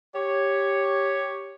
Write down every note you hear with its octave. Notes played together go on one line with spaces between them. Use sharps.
G4 C#5